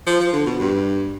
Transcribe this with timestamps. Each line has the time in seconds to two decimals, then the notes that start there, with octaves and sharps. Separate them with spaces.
0.07 F3
0.20 F3
0.33 D3
0.46 B2
0.60 G2